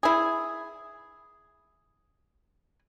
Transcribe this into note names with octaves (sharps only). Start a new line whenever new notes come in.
E4 G#4